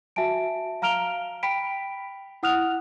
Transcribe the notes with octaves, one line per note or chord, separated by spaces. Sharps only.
F#4 E5 G#5 A5 D7
F5 A#5 F6 D7 F7 G7
G5 B5 B6 D7
E4 F#5 D#6 F6 F#6 F7